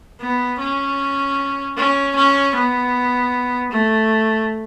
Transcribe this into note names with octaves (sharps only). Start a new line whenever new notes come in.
B3
C#4
C#4
C#4
B3
A3